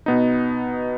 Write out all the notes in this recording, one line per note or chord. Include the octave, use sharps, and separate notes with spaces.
B2 B3 D#4